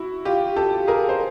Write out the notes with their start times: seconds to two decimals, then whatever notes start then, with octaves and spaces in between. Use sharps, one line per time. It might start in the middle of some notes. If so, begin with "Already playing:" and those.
Already playing: E4 F#4
0.25 F4 G4
0.56 G4 A4
0.87 G#4 A#4
1.09 C5